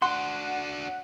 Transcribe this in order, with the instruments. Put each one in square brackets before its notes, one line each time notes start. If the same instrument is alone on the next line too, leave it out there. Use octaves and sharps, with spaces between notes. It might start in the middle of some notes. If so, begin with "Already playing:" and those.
[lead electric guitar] D4 F#4 [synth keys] F#5 [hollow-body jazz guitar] C6